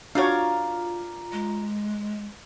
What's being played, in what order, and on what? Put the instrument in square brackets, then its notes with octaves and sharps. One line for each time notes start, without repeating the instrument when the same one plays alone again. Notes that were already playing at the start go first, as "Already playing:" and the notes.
[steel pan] D4 F#4 C#5 [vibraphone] F4 A#5 [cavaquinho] A#4 D5 F5
[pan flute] G#3